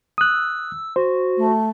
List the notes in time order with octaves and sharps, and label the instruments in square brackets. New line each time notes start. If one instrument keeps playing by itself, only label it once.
[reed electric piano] D#6 F#6 [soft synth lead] E6
[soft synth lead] F#4 [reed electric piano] C5
[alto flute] A3